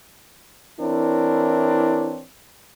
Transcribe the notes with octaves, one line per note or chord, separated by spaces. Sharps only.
E3 C4 D4 E4 A#4 C#5